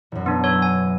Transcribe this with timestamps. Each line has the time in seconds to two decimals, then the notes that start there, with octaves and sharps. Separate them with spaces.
0.12 E1 F#2
0.26 B1 B3 D4
0.44 B4 C#5 E6 F#6
0.62 G#5